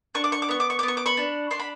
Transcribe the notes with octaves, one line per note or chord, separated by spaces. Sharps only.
D4 C#6
D6
C#6
D6
B3 C#6
D6
C#6
D6
B3
C#6
D6
B5 C#6
D4
D4 C6
B5